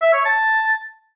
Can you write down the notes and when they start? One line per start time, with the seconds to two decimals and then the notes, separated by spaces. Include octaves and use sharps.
0.02 E5
0.14 C#5
0.25 A5